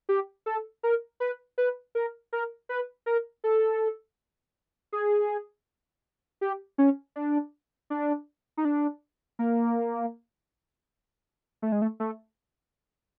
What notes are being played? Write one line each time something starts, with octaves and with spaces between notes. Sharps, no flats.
G4
A4
A#4
B4
B4
A#4
A#4
B4
A#4
A4
G#4
G4
C#4
D4
D4
D#4
D4
A#3
A3
G#3
A3
A3